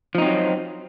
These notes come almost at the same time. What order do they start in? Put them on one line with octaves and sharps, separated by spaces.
F3 D#4 C4 F#3